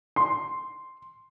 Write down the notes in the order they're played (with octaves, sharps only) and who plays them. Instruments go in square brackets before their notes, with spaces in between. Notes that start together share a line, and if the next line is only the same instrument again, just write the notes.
[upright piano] C6